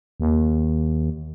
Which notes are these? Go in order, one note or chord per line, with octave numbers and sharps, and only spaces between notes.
D#2